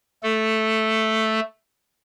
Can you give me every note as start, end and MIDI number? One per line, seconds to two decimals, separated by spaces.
0.23 1.40 57
0.23 1.40 69